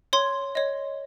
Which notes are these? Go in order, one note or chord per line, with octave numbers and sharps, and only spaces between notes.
C#5 C6 G#6
C#5 D#5